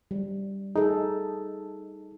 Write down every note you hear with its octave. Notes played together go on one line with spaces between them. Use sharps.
G3
D#4 G#4 A4